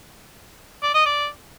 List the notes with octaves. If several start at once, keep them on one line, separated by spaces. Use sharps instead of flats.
D5
D#5
D5